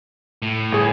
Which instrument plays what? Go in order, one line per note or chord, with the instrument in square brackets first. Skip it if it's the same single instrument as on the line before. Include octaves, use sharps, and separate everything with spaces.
[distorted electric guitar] A2
[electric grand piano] G1 G#4